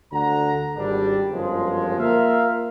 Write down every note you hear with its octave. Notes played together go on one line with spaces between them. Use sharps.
D2 D3 F#5 A#5
G#1 G3 D4
G1 F#2 F3 G#3
A#3 F4 A#4 E5 F5